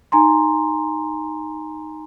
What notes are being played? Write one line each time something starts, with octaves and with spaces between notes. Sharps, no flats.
D#4 G#5 A#5 C6